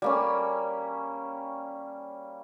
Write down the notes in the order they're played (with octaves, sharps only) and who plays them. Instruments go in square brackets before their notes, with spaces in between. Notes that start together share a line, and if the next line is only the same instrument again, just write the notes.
[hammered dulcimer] G3 A#3 C#4